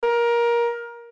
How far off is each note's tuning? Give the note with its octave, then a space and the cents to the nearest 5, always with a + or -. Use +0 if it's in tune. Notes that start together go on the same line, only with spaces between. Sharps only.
A#4 +20